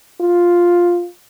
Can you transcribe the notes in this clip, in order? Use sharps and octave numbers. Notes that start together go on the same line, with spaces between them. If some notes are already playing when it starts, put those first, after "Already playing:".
F4